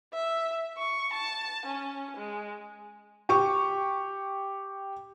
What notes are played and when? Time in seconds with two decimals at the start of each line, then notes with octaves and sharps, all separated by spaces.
0.13 E5
0.78 C#6
1.13 A5
1.66 C#4
2.16 G#3
3.29 G4 C#6